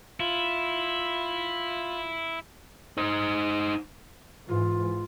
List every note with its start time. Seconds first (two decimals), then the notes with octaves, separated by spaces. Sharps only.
0.20 E4 F4
2.98 D#4 C5
4.49 G#2 E3 F4